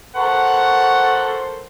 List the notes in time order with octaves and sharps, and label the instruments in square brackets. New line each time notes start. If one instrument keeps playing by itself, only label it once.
[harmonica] A4 A#4 C5 [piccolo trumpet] F#5 [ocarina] C#6